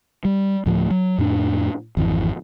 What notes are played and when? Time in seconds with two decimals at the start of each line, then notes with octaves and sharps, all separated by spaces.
0.25 G3
0.66 D2 A2 F3 A3
0.91 F#3
1.18 F2 A2 D4
1.97 G#1 F2 E3